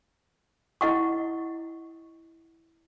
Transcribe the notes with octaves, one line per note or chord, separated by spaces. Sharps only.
E4 D#5 F#5 C#6